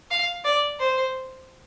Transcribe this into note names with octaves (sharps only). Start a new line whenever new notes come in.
F5
D5
C5